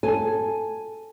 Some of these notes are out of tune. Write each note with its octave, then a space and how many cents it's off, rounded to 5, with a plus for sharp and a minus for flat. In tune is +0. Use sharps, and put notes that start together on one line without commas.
A4 +0 G#5 +0